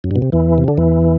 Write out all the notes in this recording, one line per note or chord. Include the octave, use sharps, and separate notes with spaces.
F#2
G2
B2
C3
E2 E3
C3
D3
E2 E3